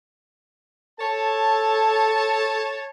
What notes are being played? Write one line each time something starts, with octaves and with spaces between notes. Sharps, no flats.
A4 C#5 A5